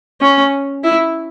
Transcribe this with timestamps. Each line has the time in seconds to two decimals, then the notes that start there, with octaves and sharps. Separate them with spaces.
0.21 C#4
0.84 E4